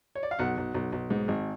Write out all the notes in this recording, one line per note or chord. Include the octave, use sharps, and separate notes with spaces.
C#5
D5
F5
B1 F#5
B1
B1
B1
G#2
G#1